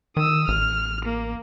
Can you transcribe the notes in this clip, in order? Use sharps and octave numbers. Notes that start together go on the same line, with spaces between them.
D#3 D#6 E6
A1 F6
A#3